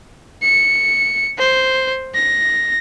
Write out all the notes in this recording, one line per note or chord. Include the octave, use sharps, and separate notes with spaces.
C#7
C5
A#6